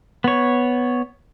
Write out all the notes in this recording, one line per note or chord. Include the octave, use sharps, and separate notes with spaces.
B3 C#5